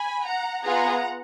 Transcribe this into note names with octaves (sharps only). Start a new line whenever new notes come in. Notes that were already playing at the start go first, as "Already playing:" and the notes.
Already playing: G#5 B5
F#5 A#5
B3 F4 G#4 F#5 A#5